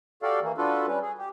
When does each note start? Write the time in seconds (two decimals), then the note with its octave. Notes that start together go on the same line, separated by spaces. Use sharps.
0.23 F#4 G4 A4 D5 F5
0.42 E3 A#3
0.58 D4 F4 F#4 A4 B4
0.87 G3 C#4 B4
1.02 G#4
1.18 G4